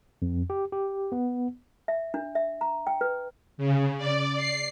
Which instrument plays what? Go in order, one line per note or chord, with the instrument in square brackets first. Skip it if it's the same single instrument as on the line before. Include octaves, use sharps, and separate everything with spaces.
[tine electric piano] F2
G4
G4
B3
[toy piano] E5
D4
E5
A#5
G5
B4
[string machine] C#3
D5
C7